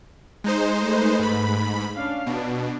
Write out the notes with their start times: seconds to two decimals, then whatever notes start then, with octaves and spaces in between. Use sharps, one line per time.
0.44 G#3 D#4 C5
0.79 A3 B4
1.19 G#2 B5
1.96 C#4 D4 F5
2.26 B2 D4